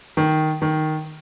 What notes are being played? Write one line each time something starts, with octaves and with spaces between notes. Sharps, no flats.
D#3
D#3